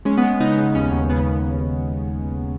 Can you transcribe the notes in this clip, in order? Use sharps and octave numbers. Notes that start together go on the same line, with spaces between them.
G#3 C#4
B3
G#3
B3
C#3 B3 D#4
B3 D#4
C#3
D#2 C#4
D#2
C#3 B3
D#2